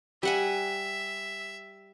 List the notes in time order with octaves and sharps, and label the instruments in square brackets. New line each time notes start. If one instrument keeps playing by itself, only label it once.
[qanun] G3 F#5 G#5 [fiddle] E5